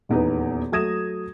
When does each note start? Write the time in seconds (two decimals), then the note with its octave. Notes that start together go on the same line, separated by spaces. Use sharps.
0.09 D#1 E2 D#4 B4
0.72 F#3 A3 D#6 G#6 A#6 E7